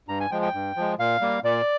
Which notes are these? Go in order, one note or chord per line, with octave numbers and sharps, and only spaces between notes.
G2 A#5
G#5
F3 G#3 G5
G5
G2
F3 G#3
A#2 F5
G3 A#3
A#2 D5